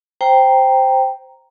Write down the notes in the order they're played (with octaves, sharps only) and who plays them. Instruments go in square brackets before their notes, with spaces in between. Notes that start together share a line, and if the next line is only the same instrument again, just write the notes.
[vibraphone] C5 G5 A#5